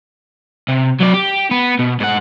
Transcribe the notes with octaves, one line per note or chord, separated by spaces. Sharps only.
C3
F#3 D5
G4
B3
B2
G#2 F#5